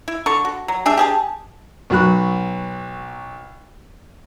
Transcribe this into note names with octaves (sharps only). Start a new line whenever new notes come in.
E4
D3 A4 C#6
F#4
F#3
G3 D4 G#4 E5
G4 G#4 A5
B1 F#3 F#4 B5 F#6